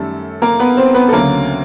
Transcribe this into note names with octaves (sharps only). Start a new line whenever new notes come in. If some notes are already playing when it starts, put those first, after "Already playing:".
Already playing: F#2 D#3 G3 A3 A4
A#3 A#4
B3 B4
C4 C5
B3 B4
A4
D2 C#3 F#3 A#3 A#4